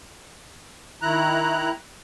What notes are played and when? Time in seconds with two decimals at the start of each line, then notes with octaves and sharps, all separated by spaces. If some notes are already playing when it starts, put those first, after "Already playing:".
1.02 D#3 E4 A#5 F#6